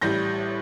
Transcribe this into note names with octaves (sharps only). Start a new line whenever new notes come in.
A1 A2 G3 G6 A#6